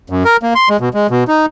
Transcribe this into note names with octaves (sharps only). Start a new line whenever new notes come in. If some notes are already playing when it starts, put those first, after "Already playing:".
F#2
A#4
A#3
C6
G#3
B2
G#3
B2
D#4